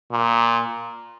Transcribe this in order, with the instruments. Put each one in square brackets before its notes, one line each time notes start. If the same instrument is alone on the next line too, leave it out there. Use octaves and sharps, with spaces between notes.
[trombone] A#2